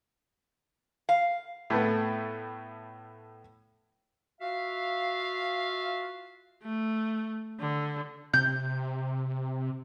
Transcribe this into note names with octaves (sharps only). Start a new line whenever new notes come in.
F5
A2 A3 B3
F4 F#4 E5 F5
A3
D3
C3 G6